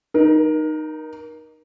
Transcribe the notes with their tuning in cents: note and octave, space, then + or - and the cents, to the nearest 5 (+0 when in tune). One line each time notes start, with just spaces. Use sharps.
D#4 -10 A#4 +25